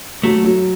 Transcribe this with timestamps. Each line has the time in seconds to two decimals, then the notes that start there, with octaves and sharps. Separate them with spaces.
0.23 F#3 A3
0.44 F#3